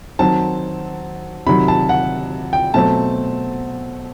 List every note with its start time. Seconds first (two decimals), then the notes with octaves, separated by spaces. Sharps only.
0.19 D#3 F#3 C4 A5
1.47 C3 D#3 F#3 B5
1.68 A5
1.89 F#5
2.53 G5
2.74 B2 F#3 A3 C4 A5